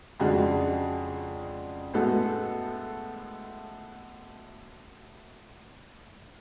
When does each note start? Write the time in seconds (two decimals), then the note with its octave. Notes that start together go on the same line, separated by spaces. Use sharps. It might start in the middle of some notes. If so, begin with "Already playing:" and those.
0.20 F2 C#3 G#3 D4 F#4
1.94 A2 G#3 B3 F#4 A4